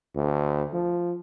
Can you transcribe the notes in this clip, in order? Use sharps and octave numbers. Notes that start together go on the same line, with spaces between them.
D2
F3